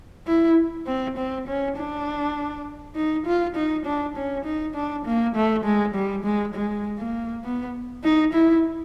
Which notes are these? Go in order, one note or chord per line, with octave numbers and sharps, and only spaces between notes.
E4
C4
C4
C#4
D4
D#4
F4
D#4
D4
C#4
D#4
D4
A#3
A3
G#3
G3
G#3
G#3
A#3
B3
D#4
E4